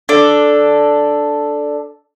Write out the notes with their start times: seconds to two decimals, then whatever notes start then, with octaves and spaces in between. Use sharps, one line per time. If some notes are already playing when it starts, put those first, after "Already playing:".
0.09 D4 A4